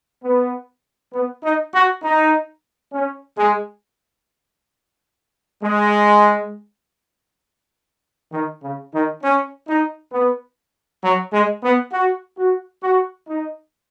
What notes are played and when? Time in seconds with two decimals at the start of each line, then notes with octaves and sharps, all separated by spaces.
0.23 B3
1.13 B3
1.43 D#4
1.73 F#4
2.03 D#4
2.92 C#4
3.37 G#3
5.63 G#3
8.32 D#3
8.63 C#3
8.93 D#3
9.22 C#4
9.68 D#4
10.12 B3
11.03 F#3
11.32 G#3
11.63 B3
11.92 F#4
12.37 F#4
12.82 F#4
13.28 D#4